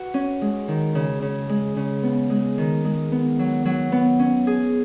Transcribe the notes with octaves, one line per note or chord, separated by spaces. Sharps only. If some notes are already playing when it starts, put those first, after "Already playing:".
Already playing: F#4 B4
C#4
G#3
D#3
C#3
C#3
G#3
C#3
B3
G#3
D#3
G#3
B3
F#3
F#3
B3
C#4
G#4